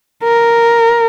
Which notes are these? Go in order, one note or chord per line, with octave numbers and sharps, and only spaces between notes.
A#4